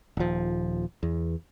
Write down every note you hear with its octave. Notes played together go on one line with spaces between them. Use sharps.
D#1 F3
E2